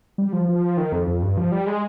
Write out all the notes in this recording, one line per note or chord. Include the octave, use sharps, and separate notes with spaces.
G3
F3
F3
D#3
F2
F2
G2
F3
G3
G#3